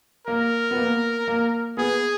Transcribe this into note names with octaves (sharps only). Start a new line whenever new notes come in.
A#3 A#4
B3
A#3
A#3
B3 G#4